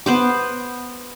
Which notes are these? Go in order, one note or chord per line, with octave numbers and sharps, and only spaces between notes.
B3 C5 D6